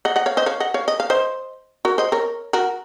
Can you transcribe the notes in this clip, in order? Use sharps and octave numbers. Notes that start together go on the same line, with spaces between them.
D#5 F#5
D#5 F#5
C#5 F5
C5 D#5
C#5 F5
D#5 F#5
C#5 F5
D#5
F5
C5 D#5
F#4 A#4
C5 D#5
A#4 C#5
F#4 A#4